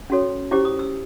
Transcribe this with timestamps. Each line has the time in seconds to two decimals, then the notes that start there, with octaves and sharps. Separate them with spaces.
0.10 C#4 F#4 A4 C#5
0.51 C#4 E4 G4 C5 D6
0.65 D#6
0.79 E6